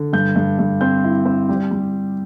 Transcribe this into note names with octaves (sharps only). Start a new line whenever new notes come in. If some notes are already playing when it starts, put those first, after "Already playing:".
Already playing: D3
G2 G6
G2
G2
C4 G6
E4
C4
G3
G3